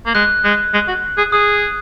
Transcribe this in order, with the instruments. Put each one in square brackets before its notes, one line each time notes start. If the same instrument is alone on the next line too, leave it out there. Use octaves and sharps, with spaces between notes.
[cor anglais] A#3
[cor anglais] G#3 [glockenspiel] F#6
[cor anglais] G#3
G#3
F#4
G#4
[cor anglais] G#4 [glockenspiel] D#6